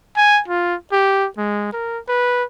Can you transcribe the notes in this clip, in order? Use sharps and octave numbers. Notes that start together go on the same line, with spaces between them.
G#5
F4
G4
G#3
A#4
B4